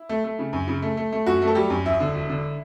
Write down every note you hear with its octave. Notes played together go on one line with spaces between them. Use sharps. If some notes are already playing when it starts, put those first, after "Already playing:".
Already playing: E4
A3
A3
C#3
F#2
C#3
A3
A3
A3
F#2 F#4
A3
A4
F#3 G3 G4
F#2
E1 E4 E5
D3
E1
D3